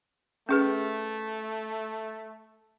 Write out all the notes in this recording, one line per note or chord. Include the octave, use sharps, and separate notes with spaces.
A3 C#4 G#4 B4